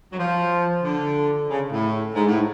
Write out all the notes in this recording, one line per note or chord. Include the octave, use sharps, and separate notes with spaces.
F#3
F3
D3
C#3
A2
G#2
A2